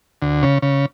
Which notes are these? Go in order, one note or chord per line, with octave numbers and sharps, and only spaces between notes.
D2
C#3
C#3